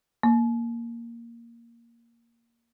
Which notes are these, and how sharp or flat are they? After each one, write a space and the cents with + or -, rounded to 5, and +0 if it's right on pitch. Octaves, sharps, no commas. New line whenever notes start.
A#3 +0